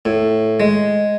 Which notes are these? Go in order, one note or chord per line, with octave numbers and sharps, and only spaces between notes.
A2
G#3